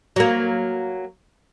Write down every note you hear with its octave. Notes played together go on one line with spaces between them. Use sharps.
F#3 A#3